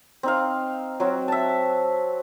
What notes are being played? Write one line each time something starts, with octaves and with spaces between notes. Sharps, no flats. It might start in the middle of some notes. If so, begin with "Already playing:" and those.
C4 D#4 F5
F#3 C4 F#4
E5 A5